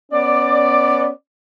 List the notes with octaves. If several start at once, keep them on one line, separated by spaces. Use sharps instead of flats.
B3 C#4 D5